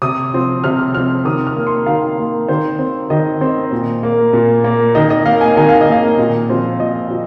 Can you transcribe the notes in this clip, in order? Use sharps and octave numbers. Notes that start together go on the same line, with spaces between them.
C3 D#6
F3 C4
C3 F6
D#6
F3 C4 F6
D#3 D#6
F6
A#3
C6
D#3 F5
A#3
D#3 C5
C4
D#3 D#5
C4
A#2
A#3
A#2
A#3
D#3 D#5
D#5
A#3 F5
G#5
D#3 G#5
F5
D#5
A#3 F5
A#2
F3 C4
A#2 D#5
F3